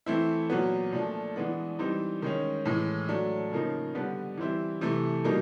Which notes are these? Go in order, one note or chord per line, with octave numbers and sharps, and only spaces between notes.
E3 A3 C4 E4
A#2 F#3 B3
A#2 F3 A3 D4
E3 G#3 B3 D4
E3 G3 C4 D#4
D#3 G#3 C#4
A2 E3 G#3
F#3 A3 D4
C#3 F3 A#3 D#4
D3 G3 B3 D4
E3 G3 C4 E4
C3 E3 A3
B2 G3 A#3 D#4